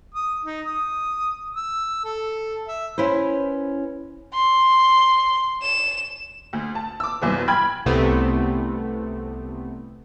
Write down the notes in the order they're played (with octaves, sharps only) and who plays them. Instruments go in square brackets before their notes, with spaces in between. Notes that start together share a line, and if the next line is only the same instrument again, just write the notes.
[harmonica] D#6
D#4
D#6
E6
A4
E5
[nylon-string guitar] C#4 E4 B4 C5
[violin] C6
E7
[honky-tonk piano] D2
A5
D6 E6
C2 F#2 E3 B3
G5 B5 F6 G#6
[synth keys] C2 C3 A3 B3